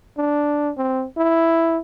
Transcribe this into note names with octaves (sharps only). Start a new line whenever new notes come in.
D4
C4
E4